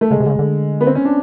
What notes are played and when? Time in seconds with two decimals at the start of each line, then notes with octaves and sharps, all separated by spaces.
0.01 A3
0.11 C#3 G#3
0.20 C3
0.26 D3
0.30 C#3
0.39 D3
0.81 B3
0.87 C4
0.95 C#4
1.05 D4